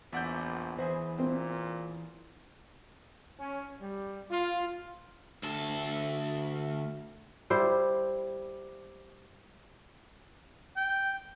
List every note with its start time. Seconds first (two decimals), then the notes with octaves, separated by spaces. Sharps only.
0.13 A#1 E2 D5 E5 F#5 G6
0.78 E3 E4 G#4 C5
1.19 A#2 C4
3.39 C#4
3.81 G3
4.30 F4
5.43 D2 A4
7.50 G3 E4 C5
10.77 G5